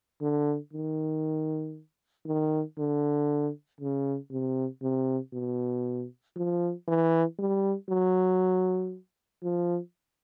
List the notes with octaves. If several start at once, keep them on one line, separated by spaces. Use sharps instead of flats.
D3
D#3
D#3
D3
C#3
C3
C3
B2
F3
E3
G3
F#3
F3